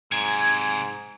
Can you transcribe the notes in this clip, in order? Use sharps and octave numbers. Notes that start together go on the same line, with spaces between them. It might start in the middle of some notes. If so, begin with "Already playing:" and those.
G#2 C3 F#3 G#5 G#6